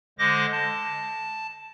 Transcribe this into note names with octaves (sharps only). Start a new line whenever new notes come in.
D3 G#3 C5 D#5 D6 A#6
A5